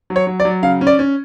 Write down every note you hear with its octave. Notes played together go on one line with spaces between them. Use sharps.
F#3
C#5
F#3
D5
F#3
C#3 F5
C#4
D5
C#4